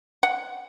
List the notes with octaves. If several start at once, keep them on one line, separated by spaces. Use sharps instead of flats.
F#5